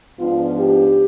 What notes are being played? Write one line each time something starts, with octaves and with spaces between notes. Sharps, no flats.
G#2 F3 B3 D4 F4
G4